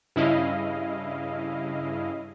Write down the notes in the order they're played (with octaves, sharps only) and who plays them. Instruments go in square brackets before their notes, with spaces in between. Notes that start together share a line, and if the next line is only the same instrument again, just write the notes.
[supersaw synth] G2 C#3 E4 D#5 F5